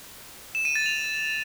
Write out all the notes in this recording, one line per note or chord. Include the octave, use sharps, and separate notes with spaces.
E7
D#7
A6
F7